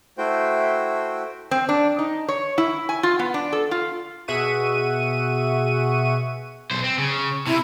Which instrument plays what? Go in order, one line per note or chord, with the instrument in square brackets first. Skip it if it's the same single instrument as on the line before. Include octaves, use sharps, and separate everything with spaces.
[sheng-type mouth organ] A3 E4 F#4 C5 G5
[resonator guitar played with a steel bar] C4
D4
D#4
C#5
E4
G#5
F4
B3
D4
A4
F4
[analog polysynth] B2 G#4 E5 F#5 C#6 D#7
[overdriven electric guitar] B1 C5
C4
C#3
[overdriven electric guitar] C3 [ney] E4